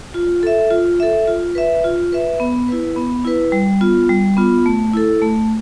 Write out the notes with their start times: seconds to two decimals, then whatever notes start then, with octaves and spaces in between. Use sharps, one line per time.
0.14 F4
0.43 A4 E5
0.71 F4
1.00 A4 E5
1.28 F4
1.55 B4 E5
1.84 F4
2.12 B4 E5
2.40 B3
2.68 E4 B4
2.96 B3
3.25 E4 B4
3.52 G3
3.80 B3 F4
4.09 G3
4.37 B3 F4
4.66 A3
4.94 E4 A4
5.22 A3